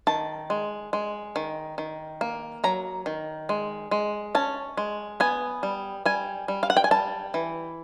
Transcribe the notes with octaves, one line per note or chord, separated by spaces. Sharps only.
D#3 A5
G#3
G#3
D#3
D#3
A#3
F#3 A#5
D#3
G#3
G#3
C#4 A5
G#3
B3 G#5
G3
G3 G#5
G3
F5
F#5
G5
G#5
G3 A5
E3